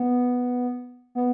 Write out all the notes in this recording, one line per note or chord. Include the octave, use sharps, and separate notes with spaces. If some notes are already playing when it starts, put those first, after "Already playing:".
Already playing: B3
B3